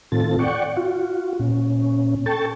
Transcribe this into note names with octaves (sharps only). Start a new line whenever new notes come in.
A2 D#3 C4 F4 A4 A6
D5 F#5 G5 C#6
F4 F#4
A#2 C#4
A4 G5 A5 C#6 A6